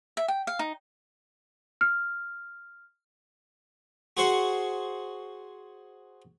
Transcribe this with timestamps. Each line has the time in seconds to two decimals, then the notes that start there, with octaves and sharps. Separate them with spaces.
0.17 E5
0.28 G5
0.47 F5
0.59 D#4
1.81 F6
4.17 F#4 G#4 C5 F#5 C#6